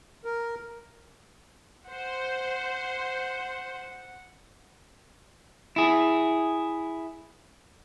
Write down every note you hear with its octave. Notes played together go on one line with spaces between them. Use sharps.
A#4
C5 F#5
E4 G#4